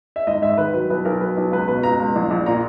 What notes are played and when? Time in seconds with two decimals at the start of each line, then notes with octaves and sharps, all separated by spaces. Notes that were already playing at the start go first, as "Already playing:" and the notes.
0.16 E5
0.27 G#1 D#5
0.42 G#2 E5
0.58 D#3 B4
0.74 F#3 B4
0.90 B1 B4
1.05 B1 A#4
1.21 F#3 B4
1.37 B1
1.52 C#2 B4
1.68 B2 B4
1.83 C#2 A#5
2.00 C#2
2.16 A#1
2.31 A#1
2.46 A#2 A#5